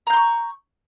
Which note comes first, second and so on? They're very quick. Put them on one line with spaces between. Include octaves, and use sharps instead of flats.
A#5 G6 C6 C#6